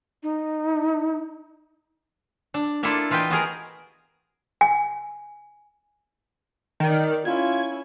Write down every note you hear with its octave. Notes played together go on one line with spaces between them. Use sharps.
D#4
D4
A#3 D4 E4 F4 A4
E3 F4 B4 D#5 G5
B3 F#4 G#4 A#4
G#5
D#3 A#4 D5
C#4 E4 F4 G#6